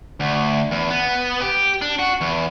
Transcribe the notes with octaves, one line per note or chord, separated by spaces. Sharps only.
D2
E2
B3
G4
D4
F#4
E2